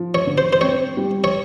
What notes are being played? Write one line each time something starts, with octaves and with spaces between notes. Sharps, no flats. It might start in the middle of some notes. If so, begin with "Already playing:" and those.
Already playing: F3
C#5
D3
C5
C5
C4 C#5
G3
C#5